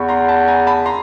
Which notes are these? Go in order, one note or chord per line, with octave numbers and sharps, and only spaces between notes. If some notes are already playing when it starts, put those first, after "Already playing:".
Already playing: E2 B5 C#6
A#5 C6
A5 B5
G#5 A#5
A5 B5
A#5 C6